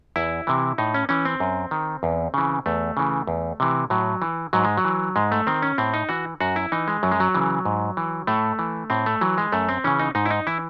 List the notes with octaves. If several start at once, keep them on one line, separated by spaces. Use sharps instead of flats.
E2 E4
C3 E3
A2 D#4
C#4
E3 C#4
C4
F#2
D#3
E2
C#3 E3
E2 A3
C#3 E3
E2
C3 E3
A2 F#3
E3
G#2 F#3
G#3
F#3
E3
G#2 G#3
A3
D#3 C4
C#4
A2 C4
D#4
E3 F#4
F#2 F#4
E4
E3 D#4
G#3
F#2 F#3
G#3
F#3
C#3 E3
G#2
E3
A2 A3
E3
A2 C4
A3
E3 F#3
G#3
F#2 A3
C4
C#3 E3 C#4
D#4
G#2 D#4
E4
D#4
E3 E4